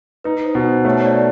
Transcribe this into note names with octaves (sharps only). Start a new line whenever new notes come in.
D#4 B4
C5
B2
C5
A3 C#5
C#5
D5